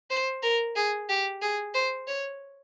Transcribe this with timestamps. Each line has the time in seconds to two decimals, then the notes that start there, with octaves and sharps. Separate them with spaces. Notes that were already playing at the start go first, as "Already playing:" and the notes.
0.10 C5
0.43 A#4
0.76 G#4
1.09 G4
1.42 G#4
1.74 C5
2.07 C#5